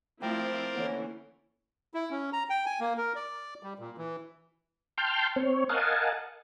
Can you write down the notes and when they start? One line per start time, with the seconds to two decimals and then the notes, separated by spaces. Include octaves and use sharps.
0.22 F3 A3 C4 E4 A#4 C5 D5 G5
0.76 D3 E3 A#3 C#4 C#5
1.94 E4
2.11 C#4
2.33 A#5
2.50 G5
2.66 G#5
2.80 A#3
2.97 A#4
3.15 D5
3.63 G3
3.79 A#2
3.98 E3
4.98 G5 A5 C6 F6 G6
5.36 C4 C#5
5.69 A#4 D#5 F5 F#5 G#5 A5